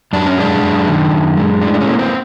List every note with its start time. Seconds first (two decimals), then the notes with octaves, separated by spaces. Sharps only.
0.13 F#2 D4
0.26 C#4
0.38 G#3 D4
0.63 F#2
0.88 D#3
1.12 F#2
1.37 G#3
1.62 A2 D4
1.74 D4
1.81 C#4
1.87 A#3
1.99 C4